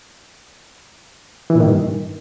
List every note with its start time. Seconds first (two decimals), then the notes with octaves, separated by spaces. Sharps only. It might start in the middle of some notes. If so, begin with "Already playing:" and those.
1.50 E3
1.55 A#2
1.60 D#3
1.66 G2